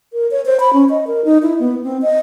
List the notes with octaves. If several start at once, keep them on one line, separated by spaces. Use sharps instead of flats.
A#4
C#5
C5
B5
C#4
D#5
A#4
D#4
E4
B3
C4
D#5